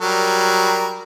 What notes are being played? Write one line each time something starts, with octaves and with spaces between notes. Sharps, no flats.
F#3 G3 A#4